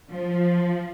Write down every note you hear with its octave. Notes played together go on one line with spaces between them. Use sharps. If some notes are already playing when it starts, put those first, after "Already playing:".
F3